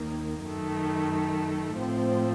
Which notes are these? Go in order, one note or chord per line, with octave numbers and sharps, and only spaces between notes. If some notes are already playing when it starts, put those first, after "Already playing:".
Already playing: D#2 D#3 A#3
F#2 D#3 A3
A2 F3 C4